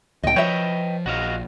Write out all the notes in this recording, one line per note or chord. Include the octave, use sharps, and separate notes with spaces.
D2 A#2 D3 D#5 G5
F3 B4 C#5 D#5 E5 G5
A#1 F#4 D#5 F5